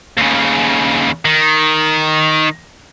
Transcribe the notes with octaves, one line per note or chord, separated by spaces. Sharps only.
D#2 C#3
D#3